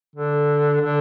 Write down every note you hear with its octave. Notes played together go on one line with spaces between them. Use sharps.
D3
D3